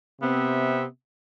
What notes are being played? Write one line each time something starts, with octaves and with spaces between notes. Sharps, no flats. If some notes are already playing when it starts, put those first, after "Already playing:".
C3 B3 C4 E5